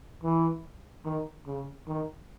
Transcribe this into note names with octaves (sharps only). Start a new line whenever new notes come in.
E3
D#3
C#3
D#3